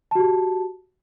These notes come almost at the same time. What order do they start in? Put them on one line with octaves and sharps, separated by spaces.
A5 F#4 G4